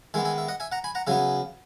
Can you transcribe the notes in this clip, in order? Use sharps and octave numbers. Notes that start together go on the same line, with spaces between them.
D#3 G#3 B3 E5 G#5
E5 G#5
E5
D#5 F#5
E5 G#5
F#5 A#5
G#5 B5
F#5 A#5
C#3 F#3 B3 E5 G#5